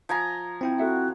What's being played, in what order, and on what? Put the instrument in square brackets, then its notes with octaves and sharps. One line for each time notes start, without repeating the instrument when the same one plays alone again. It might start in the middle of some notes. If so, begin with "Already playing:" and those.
[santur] F3 G#5 A#5
[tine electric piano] C4 E4 G5 [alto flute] F4
[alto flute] F#4 [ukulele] A4 E5 F#5